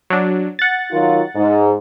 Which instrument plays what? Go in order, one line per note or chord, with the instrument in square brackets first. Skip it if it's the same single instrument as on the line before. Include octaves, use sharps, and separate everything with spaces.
[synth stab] F#3 D4
F#5 A6
[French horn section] D#3 F#3 F4
G#2